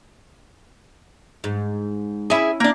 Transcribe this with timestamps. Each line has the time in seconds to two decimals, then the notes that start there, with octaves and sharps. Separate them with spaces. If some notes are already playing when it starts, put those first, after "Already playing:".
1.44 G#2
2.30 C#4 E4 G#4 E5
2.60 A#3 D4